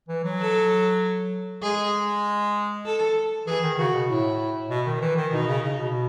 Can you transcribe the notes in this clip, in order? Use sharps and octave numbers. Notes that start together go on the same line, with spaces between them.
E3
F#3
A4
G#3 G#4
A4
E3 G#4
D#3
D#3
C#3 F#4
B2
A2 E4
B2
D#3
E3
D#3
B2 D#4
C#3
C#3
B2